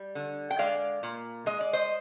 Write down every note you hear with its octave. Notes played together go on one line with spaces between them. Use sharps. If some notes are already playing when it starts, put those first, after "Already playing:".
Already playing: G3
D3
G5
G#3 D5 F5
A#2
G#3 D#5
D5
C5 D#5